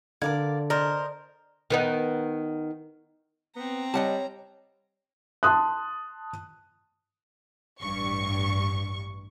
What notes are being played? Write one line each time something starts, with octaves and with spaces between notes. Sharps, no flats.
D3 A#4 D5 F5 G#6
A#4 C5 D5 D#5
D#3 B3 D#4
B3 C4 A#5
G3 C#5 D#5 F#5 A5
A5 C6 D#6 F#6
A1 G2 C#6